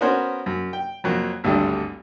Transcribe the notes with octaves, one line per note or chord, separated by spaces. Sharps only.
B3 C#4 F#4 A#4 C5 C#5
F#2
G5
F2 F#3 A#3
G#1 D2 G2 D3 G3 A4